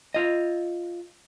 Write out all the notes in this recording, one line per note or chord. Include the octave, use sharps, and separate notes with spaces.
F4 D#5